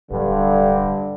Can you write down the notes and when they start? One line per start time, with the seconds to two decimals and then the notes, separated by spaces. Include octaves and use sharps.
0.11 D1 G2 D3